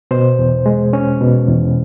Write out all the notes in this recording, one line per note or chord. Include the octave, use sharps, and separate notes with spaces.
B2 C5
E2
G#3
C#4
B2
E2